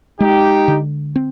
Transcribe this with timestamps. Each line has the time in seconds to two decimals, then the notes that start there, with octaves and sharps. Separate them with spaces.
0.20 G#3 D#4 G4
0.68 D3
1.16 C4